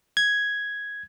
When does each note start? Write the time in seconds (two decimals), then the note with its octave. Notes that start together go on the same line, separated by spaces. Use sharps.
0.17 G#6